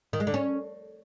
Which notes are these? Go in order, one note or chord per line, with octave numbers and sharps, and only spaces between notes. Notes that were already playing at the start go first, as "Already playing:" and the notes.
D#3
G#3
D3
C#4